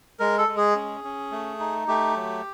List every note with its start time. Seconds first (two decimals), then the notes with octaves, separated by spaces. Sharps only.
0.19 G#3 A#4
0.38 A4
0.48 G#3
0.57 G#4
0.76 C#4
1.04 C#4
1.32 A3
1.60 D#4
1.88 A3 G4
2.16 F#3